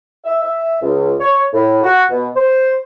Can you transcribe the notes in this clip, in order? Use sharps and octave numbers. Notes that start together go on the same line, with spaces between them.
E5
E5
C#2
C#5
A2
F#4
B2
C5